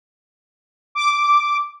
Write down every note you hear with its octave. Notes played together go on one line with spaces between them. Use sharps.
D6